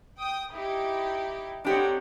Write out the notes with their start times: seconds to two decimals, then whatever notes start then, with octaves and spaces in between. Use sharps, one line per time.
0.19 G5 D#6
0.54 D#4 E4 G4
1.65 C4 D4 D#4 G4 C#5 F#5